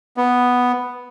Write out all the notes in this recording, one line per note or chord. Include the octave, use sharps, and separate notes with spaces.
B3